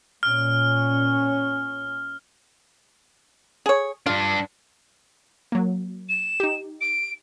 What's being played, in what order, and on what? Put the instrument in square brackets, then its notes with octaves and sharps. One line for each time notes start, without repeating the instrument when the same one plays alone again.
[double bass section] A#2 C#4 [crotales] F6
[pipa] G#4 C#5
[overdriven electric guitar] G2 D4 [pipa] F4
[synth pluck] F#3 A#3
[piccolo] E7
[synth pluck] D#4 G4
[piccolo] D7